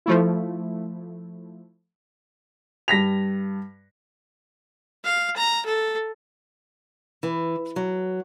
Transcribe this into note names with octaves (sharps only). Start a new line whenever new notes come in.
F3 A3 E4
G2 A#6 B6 F7
F5
A#5
A4
E3
F#3